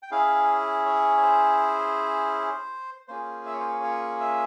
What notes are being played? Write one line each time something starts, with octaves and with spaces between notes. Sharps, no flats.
G5
C#4 E4 G#4 F5
C#5
C#5
C5
A#3 C#4 F4 G#4 C5
E5
C#5
C5
C#5
C#5
E5